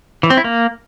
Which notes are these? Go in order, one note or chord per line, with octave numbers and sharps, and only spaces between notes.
E3
C4
E4
A#3